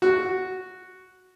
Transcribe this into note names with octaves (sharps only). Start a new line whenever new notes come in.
F#4